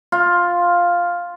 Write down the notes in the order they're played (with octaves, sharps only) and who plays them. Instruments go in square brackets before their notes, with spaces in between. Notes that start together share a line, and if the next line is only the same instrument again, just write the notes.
[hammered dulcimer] F4